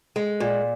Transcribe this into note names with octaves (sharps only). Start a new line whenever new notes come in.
G#3
A#2